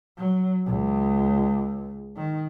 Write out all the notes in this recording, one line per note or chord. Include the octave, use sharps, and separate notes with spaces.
F#3
C#2
D#3